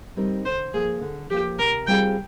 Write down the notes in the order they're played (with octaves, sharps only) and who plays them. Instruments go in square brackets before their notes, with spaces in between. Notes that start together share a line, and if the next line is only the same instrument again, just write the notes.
[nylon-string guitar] G3 C4 D#4 A#4
[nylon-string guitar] D3 [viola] C5
[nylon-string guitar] F3 A#3 [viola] G#4
[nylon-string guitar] D3
[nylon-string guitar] F3 A#3 [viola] G4
[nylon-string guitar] C3 [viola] A#4
[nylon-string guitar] G3 C4 F4 G#4 [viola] G5